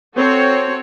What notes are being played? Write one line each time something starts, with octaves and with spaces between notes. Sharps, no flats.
C4 F#4 A4 C#5